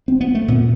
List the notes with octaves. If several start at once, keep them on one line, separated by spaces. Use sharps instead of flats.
C4
B3
A3
A#2 B3